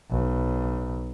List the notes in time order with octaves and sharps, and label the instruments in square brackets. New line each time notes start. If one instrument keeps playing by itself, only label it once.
[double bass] B1